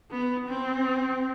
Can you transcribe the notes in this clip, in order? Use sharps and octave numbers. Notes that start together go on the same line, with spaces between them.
B3
C4